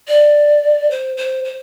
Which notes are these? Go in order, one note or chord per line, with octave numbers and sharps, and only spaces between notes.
D5
C5
C5
C5